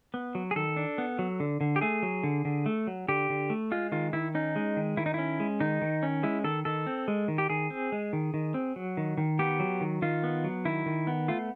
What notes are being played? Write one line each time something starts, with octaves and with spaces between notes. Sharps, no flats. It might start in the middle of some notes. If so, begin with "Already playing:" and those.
B3
F#3
G#4
D#3 A4
D4
B3
F#3
D3
D3
G4
A3 G#4
F#3
D3
D3
A3
F#3
D3 G4
D3
A3
G#3 F4
D#3 F4
D#3 E4
C#4 D#4
G#3
D#3
D#3 E4
D#4
C#4 E4
G#3
D#3 D#4
D#3
C#4
G#3 E4
D#3 A4
D#3 A4
C4
G#3
D#3
G4
D#3 G#4
C4
G#3
D#3
D#3
C4
F#3
D#3
D#3
B3 G4
F#3
D#3
D#3 F4
B3
F#3
D#3 E4
D#3
B3
A3 F4